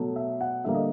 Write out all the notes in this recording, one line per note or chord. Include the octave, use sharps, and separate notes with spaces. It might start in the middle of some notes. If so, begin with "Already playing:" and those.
Already playing: B2 F#3 A3
E5
F#5
D3 G3 A#3 E5
D#5